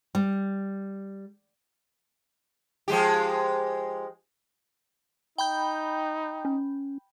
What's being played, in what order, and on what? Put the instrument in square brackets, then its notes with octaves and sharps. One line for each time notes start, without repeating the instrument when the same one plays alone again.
[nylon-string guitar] G3
[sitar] F3 G#3 G4
[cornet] D#4 [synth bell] G5 B5 G6
[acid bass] C#4